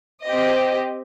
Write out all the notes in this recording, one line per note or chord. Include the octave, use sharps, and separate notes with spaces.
C4 G4 D#5